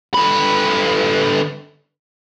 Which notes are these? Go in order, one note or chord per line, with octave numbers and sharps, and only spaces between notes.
D3 B4